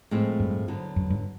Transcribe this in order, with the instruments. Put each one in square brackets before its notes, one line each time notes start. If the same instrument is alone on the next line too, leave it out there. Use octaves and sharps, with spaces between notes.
[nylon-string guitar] A2 F3 G#3 C4
[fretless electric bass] G2
[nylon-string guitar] D3 F#3 B3
[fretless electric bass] F#2
G2